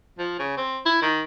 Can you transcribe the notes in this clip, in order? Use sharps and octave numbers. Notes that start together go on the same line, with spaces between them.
F3
C#3
C4
E4
D#3